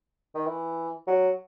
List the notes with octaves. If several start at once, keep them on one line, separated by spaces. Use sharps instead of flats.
D#3
E3
F#3